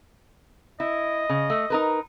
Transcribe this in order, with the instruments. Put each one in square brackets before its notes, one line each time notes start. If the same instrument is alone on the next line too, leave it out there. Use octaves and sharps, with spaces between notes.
[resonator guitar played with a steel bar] E4 [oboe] D#5
[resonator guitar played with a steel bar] C#3
A3
D#4 A#4 B4